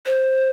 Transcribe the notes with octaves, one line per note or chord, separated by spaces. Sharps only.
C5